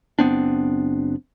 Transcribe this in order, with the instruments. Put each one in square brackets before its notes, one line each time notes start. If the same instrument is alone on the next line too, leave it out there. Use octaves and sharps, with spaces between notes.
[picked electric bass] F#1 B3 C4 D4